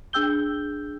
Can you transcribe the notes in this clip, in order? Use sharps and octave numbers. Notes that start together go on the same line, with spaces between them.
D4 G#4 G5 E6 G6 G7